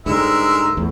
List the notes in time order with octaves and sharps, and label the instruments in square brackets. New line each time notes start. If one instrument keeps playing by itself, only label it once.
[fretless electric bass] G#2 D3 G3 [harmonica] G#3 E5 [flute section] A#4 E6
[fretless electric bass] E2 A2